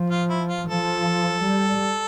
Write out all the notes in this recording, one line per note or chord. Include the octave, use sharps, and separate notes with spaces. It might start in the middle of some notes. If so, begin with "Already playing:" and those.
Already playing: F3
F4
E4
F4
F3 A4
G3